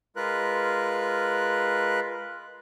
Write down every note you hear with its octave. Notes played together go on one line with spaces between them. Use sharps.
G#3 F4 A#4 B4 F#6